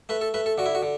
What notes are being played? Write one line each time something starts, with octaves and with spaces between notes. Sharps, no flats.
A3 B4
A4
A3 B4
A4
D3 F#4
E4
F#4
D3